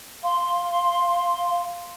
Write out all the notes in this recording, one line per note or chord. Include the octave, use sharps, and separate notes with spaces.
F5 C6